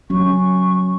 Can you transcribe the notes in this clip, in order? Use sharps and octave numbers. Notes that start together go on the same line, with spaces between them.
F#3 C#4 C#6